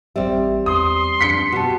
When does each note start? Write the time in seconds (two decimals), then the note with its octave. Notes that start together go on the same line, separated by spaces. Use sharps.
0.16 A1 G3 C4 G4 E5
0.66 E2 C6 D#6
1.21 F2 D4 B6 C#7
1.52 B2 F#4 G4 A5